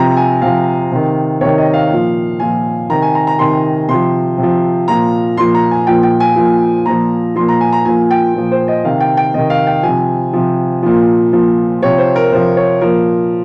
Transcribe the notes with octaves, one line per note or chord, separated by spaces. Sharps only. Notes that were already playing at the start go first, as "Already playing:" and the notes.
Already playing: C3 F3 A#5
G#5
C3 F3 F5
C3 D#3
C3 D#3 C#5
D#5
F5
A#2 F3
A#2 F3 G#5
C3 D#3 A#5
G#5
A#5
A#5
C3 D#3 C6
C3 C6
F3
C3
F3
A#2 F3 A#5
A#2 F3 C6
A#5
G#5
A#2 F3 G5
G5
G#5
A#2 F3
A#2 F3 A#5
A#2 F3 C6
A#5
G#5
A#5
A#2 F3 G#5
G5
A#2 F3
C5
D#5
C3 D#3 F5
G5
G5
C3 D#3 D#5
F5
G5
C3 F3 G#5
C3 F3
A#2 F3
A#2 F3
C3 F3 C#5
C5
A#4
C3 F3 C5
C#5
A#2 F3 A#4